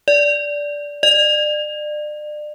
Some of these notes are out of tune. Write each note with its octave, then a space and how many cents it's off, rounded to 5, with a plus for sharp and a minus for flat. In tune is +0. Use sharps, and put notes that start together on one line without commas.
D5 -10
D5 +35